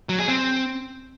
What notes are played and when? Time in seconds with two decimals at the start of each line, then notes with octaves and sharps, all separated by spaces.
0.09 F#3
0.19 G#4
0.28 C4